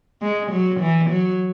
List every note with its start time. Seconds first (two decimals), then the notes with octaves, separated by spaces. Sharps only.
0.22 G#3
0.51 F#3
0.80 E3
1.10 F#3